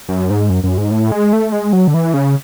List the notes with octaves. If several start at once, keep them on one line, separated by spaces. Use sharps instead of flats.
F#2
G#2
F#2
F#2
G#2
A2
G#3
A3
G#3
F#3
D3
E3
C#3